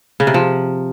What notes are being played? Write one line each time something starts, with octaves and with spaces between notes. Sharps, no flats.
C#3
C3
F3